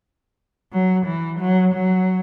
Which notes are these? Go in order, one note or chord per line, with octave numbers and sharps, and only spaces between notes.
F#3
E3
F#3
F#3